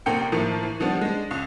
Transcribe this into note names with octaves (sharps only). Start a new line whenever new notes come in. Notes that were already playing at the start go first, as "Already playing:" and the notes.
A#1 C3 A#3 G5 C#7
A2 D#3 F3 A#3
E3
D#3 F3 G3 B3 D4
G#3 D4
C#2